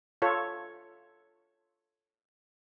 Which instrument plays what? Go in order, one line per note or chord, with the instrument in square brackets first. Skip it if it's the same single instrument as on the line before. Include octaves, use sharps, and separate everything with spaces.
[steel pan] F4 A4 C#5